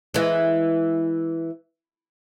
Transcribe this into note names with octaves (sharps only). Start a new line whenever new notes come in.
E3 G#3